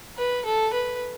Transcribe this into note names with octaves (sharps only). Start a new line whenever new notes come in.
B4
A4
B4